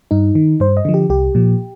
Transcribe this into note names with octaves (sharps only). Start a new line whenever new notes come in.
G2 D#4
D#3
G2 C5
D#5
D3 F3
G4
C2 G4
A#2 F3